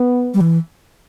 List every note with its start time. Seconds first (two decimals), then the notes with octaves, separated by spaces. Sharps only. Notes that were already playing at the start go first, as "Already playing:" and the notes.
Already playing: B3
0.34 G3
0.41 E3